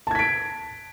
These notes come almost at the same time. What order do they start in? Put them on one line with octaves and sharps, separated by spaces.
A5 G#6 B6 D7